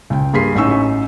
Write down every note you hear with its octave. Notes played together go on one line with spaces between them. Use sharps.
C#2 G5
G2 A#3 G#4 C6 B6 C7
A1 C#4 D#4 C#6 E6